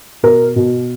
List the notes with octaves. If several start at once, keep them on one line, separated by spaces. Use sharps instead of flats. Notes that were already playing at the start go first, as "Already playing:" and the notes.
B2 A#4
B2